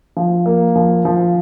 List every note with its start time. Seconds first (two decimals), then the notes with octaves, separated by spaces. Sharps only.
0.17 F3
0.46 A#3
0.76 F3
1.05 F3